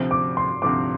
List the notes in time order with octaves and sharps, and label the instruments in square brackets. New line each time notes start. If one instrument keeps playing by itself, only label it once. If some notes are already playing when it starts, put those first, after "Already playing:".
Already playing: [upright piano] D2 C3 F3 C4
[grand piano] D6
C6
[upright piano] D2 C3 F3 C4 [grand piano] D6